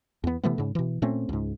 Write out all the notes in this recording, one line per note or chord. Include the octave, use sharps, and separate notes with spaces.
E2 B3
C3 E3 A3 B3
G#2 C#3
B2 E3
A#2 A3 C4 C#4
C#2 G#2